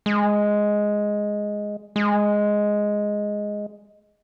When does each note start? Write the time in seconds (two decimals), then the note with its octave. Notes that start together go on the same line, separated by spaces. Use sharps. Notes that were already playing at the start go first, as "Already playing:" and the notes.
0.06 G#3
1.96 G#3